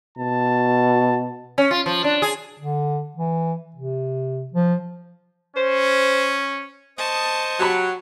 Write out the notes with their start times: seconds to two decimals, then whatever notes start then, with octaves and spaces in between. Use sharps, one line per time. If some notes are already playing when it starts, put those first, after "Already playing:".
0.18 B2 A5
1.58 C#4
1.71 F4
1.86 F3
2.04 D4
2.22 G#4
2.59 D3
3.16 E3
3.76 C3
4.53 F3
5.56 C#4 C5
6.98 C5 D#5 A5 C#6 D#6
7.59 F#3 F#4 G4 B5